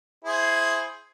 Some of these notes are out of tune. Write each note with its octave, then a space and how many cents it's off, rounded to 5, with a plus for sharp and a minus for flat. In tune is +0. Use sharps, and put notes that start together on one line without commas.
E4 +0 G#4 +10 C5 +0